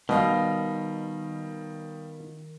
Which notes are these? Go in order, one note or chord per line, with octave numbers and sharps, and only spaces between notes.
B2 D#3 G3 D#5 F5